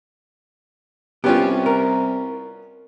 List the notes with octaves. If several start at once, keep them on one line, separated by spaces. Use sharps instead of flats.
C2 B3 C#4 F4 G4
A#4